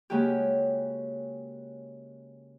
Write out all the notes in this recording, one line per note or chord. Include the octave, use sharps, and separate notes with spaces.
C#3 G#3 A#3 F#4 G4